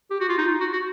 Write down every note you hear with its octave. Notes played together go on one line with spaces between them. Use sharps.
G4
F#4
F4
D#4
F4
F#4
F#4